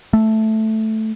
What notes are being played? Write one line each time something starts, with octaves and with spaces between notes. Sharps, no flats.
A3